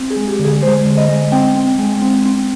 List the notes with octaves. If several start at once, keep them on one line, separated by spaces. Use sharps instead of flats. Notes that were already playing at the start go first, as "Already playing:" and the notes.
Already playing: C4
G#4
G#3
G4
D3
G#4
G#3 C5
D3
D#5
G#3
C4 G5
C4
G#3
C4
C4